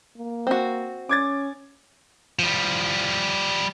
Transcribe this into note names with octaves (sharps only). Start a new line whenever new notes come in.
A#3
C4 F#4
C#4 D6 G#6 A6
F3 G3